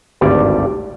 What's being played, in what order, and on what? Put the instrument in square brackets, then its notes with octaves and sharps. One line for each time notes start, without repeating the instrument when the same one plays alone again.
[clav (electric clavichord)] G#1 D2 G2 G3 D5